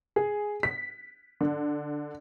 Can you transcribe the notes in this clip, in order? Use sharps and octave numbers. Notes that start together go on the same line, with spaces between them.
G#4
B6
D3